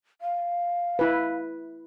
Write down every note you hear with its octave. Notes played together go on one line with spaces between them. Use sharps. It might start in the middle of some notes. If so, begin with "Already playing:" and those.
F5
E4 B4